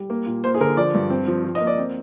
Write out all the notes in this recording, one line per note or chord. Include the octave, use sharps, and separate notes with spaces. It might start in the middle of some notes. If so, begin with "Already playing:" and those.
Already playing: G3
A#3
A#2
A#3 C5
G#4
D3 A#4
F3 D5
G2
C4
F3
F3
D#5
A#3
D5
C4